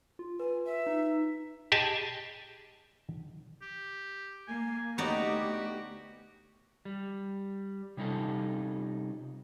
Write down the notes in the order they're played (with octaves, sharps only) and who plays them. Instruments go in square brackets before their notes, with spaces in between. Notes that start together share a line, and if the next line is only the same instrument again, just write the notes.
[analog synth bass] F4
[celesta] B4 [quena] G#5
[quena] E5
[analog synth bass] D#4
[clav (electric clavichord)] G4 G#4 D#5 G#5 A5
[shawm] G4
[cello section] A#3 [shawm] G#5
[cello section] D2 G4 [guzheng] B3 D#4 D5 [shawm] F#4
[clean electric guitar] G3
C3 G3 C#4 D#4 F4 A4